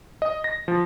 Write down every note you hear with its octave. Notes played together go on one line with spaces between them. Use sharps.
D#5
A#6
F3